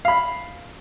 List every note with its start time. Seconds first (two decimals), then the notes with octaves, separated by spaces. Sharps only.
0.05 F5 B5